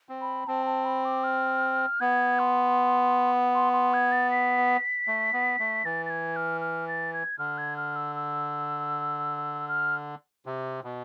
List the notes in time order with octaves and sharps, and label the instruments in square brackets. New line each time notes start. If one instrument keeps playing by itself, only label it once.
[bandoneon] C4
[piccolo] B5
[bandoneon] C4 [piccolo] A5
[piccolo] A5
B5
D6
F6
[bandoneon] B3 [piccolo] G#6
[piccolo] C6
C6
C6
G#6
A6
B6
[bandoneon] A3
B3
A3
[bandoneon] E3 [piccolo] A6
[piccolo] A6
G#6
F6
F6
A6
G#6
[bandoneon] D3 [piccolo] F6
[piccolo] G#6
F6
E6
E6
F6
[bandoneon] C3
B2